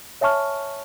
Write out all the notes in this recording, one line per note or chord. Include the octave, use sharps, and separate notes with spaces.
C#5 E5 G#5 A5 C#6 F6